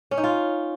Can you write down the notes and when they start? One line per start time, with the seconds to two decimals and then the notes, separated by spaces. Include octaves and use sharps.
0.11 C#4
0.17 D#4
0.24 F4